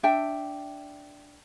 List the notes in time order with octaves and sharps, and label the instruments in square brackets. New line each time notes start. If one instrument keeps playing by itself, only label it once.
[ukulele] D4 E5 G5